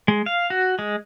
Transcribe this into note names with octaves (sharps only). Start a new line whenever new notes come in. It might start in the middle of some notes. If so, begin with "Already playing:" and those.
G#3
F5
F#4
G#3